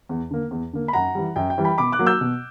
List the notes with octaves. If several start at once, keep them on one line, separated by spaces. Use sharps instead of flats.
E2
D3 A#3
E2
D3 A#3
B5
F#2 F#5 A#5
E3 G3
F#2 G5
G5
E3 G3
G5 B5
B2 B5 D6
D6 F#6
F#3 A#3
E6 G6
B2